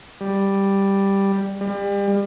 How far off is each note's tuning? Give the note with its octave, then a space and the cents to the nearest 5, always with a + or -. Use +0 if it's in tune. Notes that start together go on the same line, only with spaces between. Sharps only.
G3 +5
G3 +35